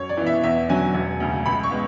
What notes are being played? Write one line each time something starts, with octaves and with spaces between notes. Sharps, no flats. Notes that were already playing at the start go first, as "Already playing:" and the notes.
Already playing: F#2 C#5
D5
E3 B3
E5
E2 E5
D3 F#3 C#4 G#5
E1
D2 C#3
C#2 B5
C#6
G#3 B3